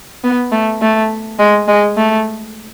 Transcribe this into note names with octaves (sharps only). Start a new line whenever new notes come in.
B3
A3
A3
G#3
G#3
A3